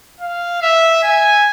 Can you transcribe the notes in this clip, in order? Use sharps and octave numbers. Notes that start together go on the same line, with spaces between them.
F5
E5
G#5